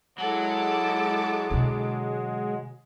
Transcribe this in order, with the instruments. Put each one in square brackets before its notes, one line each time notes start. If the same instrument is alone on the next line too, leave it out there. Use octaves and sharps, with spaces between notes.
[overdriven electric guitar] F#3 [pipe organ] G#3 [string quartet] E4 A4 D6
[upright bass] B2 D3